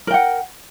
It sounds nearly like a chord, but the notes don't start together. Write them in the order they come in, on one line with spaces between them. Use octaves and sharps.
A#4 G5 F#5